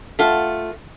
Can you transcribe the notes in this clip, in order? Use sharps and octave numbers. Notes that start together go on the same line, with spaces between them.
A3 F4 F#5